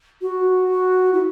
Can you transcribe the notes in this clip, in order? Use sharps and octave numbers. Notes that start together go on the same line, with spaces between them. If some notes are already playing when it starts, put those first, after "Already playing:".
F#4
E4